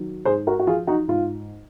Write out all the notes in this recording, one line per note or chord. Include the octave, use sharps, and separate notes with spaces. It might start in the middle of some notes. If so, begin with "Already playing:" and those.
Already playing: D#3 F#3
G#2 G#4 C5
F#4 A#4
F#4
F3 F4 G#4
D#4 F#4
G#2 F4